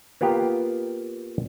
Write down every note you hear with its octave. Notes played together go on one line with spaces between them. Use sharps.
A#3 B3 F4 G4 F5